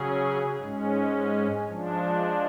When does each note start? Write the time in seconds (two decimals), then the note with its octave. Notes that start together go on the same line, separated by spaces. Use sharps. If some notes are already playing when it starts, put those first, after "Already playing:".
Already playing: C#3 F#3 C#4 G#4
0.60 G#2 G#3 C#4
1.69 F3 G#3 D4